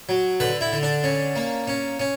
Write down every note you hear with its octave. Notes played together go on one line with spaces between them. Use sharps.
F#3
D3 B4
E4
D3
D4
C#4
A#3
C#4
C#4